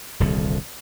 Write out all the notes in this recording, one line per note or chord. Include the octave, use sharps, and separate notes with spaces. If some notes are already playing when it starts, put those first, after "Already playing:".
D#1 C2 D3